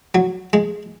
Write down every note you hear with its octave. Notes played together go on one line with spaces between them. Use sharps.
F#3
G#3